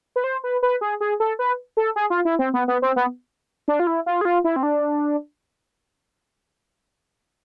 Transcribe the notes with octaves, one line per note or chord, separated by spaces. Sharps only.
B4
C5
B4
B4
G#4
G#4
A4
B4
A4
G#4
F4
E4
C4
B3
B3
C4
B3
D4
F4
E4
F4
G#4
F4
E4
C4
D4